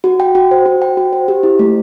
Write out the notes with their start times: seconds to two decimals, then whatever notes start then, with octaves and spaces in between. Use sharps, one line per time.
0.04 F#4
0.20 G5
0.35 F#4
0.51 C5
0.66 F#4
0.82 G5
0.97 F#4
1.13 C5
1.28 G4
1.43 E4
1.59 A3